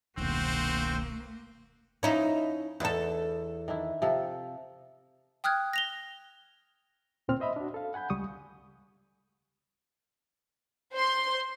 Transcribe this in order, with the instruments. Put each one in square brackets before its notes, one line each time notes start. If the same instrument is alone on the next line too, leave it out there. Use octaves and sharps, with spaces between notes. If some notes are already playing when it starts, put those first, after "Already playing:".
[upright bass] E1 [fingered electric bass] C2 D#3 [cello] A#3 [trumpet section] C4 F#4 C5
[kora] F3 [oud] C#4 D#4 E4
[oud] E2 A4 [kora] D#4
[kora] D#3 D4 E4
C3 F3 A4
[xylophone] G5 D#6 F6 F#6 G#6
A#6 F7 G7
[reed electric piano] D2 A#2 C4 F6
C5 D#5 E5 B5
D4 F#4
A4 F5
F#5 G#5 B5 G6
C#2 G3 C#6 D#6
[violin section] C5 C6